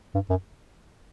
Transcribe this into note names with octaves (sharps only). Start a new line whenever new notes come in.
G2
F#2